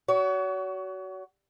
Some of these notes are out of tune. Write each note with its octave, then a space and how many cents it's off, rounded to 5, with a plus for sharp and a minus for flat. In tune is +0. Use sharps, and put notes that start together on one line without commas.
F#4 +20 C#5 +40